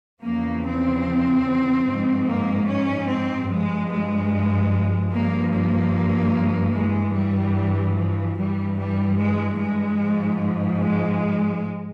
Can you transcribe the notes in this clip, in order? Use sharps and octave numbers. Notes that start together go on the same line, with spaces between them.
E2 C#3 F3 A#3
C4
G#2 F3
A#3
C#4
C4
G2 F3 G#3
G#3
G2 F3 A#3
A#3
G2 E3 G#3
G3
F3
G2 E3 G3
G3
G#3
G#3
G#2 F3
G#3